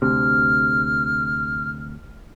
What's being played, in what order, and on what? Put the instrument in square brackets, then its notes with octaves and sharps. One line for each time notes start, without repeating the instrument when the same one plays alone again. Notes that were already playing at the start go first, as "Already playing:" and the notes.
[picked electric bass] D2 C3 [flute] F6